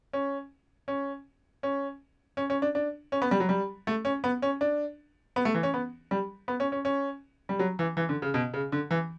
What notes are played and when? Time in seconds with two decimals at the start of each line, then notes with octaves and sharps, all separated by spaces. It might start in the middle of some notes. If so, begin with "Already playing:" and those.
0.13 C#4
0.88 C#4
1.63 C#4
2.37 C#4
2.50 C#4
2.62 D4
2.75 D4
3.12 C#4
3.22 B3
3.31 G3
3.40 F#3
3.49 G3
3.87 A3
4.05 C#4
4.24 B3
4.42 C#4
4.61 D4
5.36 B3
5.45 A3
5.54 E3
5.63 C#4
5.74 B3
6.11 G3
6.48 B3
6.60 C#4
6.72 C#4
6.85 C#4
7.49 G3
7.59 F#3
7.79 E3
7.97 E3
8.09 D3
8.22 C#3
8.34 B2
8.54 C#3
8.72 D3
8.91 E3